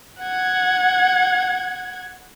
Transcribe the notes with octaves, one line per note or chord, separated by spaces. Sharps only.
F#5 G#6